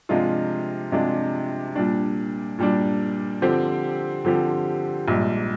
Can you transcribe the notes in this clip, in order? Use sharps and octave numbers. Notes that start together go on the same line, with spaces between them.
C3 F3 G#3 D4 F4
C3 F3 G#3 D4 F4
A#2 G3 D4
A#2 G3 D4
D3 F3 C4 G4
D3 F3 C4 G4
A#1 G#2 G3